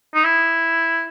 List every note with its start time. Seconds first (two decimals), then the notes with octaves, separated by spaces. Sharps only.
0.15 D#4
0.24 E4